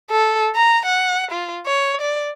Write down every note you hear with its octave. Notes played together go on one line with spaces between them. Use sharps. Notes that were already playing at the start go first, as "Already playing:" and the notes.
A4
A#5
F#5
F4
C#5
D5